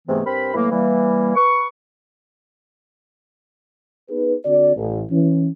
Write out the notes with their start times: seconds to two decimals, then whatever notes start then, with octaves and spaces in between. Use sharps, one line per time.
0.07 G#2 C3 E3 A3 B3
0.25 G2 C4 A#4 C5 B5
0.54 A2 E3 F#3 A3 A#3
0.71 E3 G3 A#3
1.35 B4 C#6
4.10 B3 D#4 G#4 B4
4.45 D3 C4 F#4 D5
4.76 A1
5.11 E3 C#4